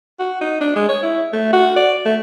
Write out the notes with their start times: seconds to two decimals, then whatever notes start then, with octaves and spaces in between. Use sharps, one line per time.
0.19 F#4
0.41 D#4
0.61 D4
0.76 G#3
0.89 C#5
1.03 E4
1.33 A3
1.53 F#4
1.76 D5
2.05 A3